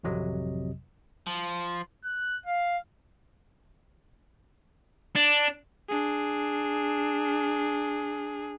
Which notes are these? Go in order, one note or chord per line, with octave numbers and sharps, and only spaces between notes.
A1 F2 C3 F#3 D#5
F3
F#6
F5
D4
D4 G#4